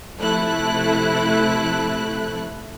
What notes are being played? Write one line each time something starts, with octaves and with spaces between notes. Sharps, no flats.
C3 F3 A3 E4 A4 F#6